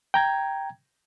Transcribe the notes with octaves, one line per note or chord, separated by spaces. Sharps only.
G5 A#5 G#6